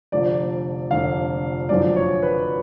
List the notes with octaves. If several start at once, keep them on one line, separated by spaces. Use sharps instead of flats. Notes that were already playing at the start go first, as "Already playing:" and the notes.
F1 F2 D3 F3 D5
F1 F2 D3 F3 F5
F#1 F#2 D3 F3 D5
C#5
B4